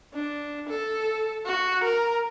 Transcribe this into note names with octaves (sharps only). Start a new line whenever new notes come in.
D4
A4
F#4
A#4